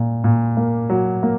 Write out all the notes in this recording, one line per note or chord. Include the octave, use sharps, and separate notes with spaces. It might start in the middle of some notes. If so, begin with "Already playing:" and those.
Already playing: A#2
A#2
A#3
F#3
A#3